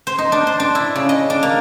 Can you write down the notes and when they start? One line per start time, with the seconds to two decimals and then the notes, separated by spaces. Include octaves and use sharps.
0.07 C5
0.18 D#4
0.32 D4
0.47 C5
0.60 D4
0.75 E4
0.96 C#3
1.09 D#5
1.30 D4
1.43 A#3